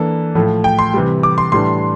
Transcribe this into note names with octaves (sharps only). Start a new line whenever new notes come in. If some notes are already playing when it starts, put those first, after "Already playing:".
Already playing: E3 A#3 D4 A4
A2 F3 A3
G5
C6
C3 E3 G3
D6
C6
A2 E3 G3 D4 C6